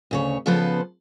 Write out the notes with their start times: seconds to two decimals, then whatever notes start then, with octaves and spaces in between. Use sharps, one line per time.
0.11 D2 C#3 C#5
0.46 C#3 F3 B3 A4 B4 C5